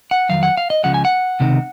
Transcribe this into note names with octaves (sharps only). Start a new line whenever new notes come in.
F#5
F2 D#3 F#3 F5
F#5
F5
D#5
C#2 C#3 F3 G#3 F#5
G#5
F#5
C#2 C3 D#3